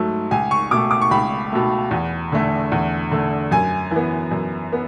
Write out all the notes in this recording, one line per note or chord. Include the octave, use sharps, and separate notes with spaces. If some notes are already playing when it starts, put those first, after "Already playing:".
Already playing: G#2 F#3 A3
C#2 G#5
C#6
B2 A3 D6
D6
C#6
C#2 B5
B2 A3
E2
D3 A3
E2
D3 A3
F#2 G#5
E3 B3
F#2
B3